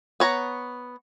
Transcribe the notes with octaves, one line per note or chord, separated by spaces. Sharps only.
B3 C#5 A#5